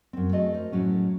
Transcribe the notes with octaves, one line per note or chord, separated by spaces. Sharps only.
F#2 C4
A3 F#4 G#4 D#5
A#4 C5
A2 F#3 C#4